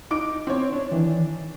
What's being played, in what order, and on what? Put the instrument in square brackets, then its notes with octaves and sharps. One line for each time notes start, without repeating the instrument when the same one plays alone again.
[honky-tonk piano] D#4 D6 D7
C4 C#5
[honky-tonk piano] D4 [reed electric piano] C#5
[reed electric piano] D#3 E3